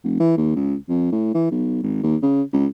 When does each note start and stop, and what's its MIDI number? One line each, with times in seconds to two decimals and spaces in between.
0.04 0.16 29
0.20 0.36 52
0.37 0.55 39
0.56 0.76 37
0.89 1.07 41
1.12 1.31 45
1.34 1.50 52
1.51 1.81 35
1.83 2.00 32
2.03 2.16 39
2.23 2.42 49
2.53 2.67 37